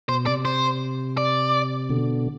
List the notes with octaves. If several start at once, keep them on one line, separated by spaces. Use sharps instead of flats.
B2 C5
C3 D5
C5
D5
B2 D3